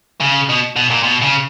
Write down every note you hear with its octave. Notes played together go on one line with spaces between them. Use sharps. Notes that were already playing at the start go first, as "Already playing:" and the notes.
C#3
B2
B2
A#2
B2
C#3